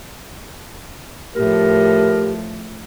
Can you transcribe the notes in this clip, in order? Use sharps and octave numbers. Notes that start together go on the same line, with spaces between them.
A2 F3 G4 A#4